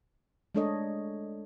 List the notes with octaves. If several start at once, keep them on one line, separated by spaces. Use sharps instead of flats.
G#3 A3 D4 A4 C#5 D#5